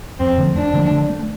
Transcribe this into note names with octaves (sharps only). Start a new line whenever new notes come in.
F2 C4
D3 F3 A3
F2 D4
D3 F3 A3
D3
A3 D4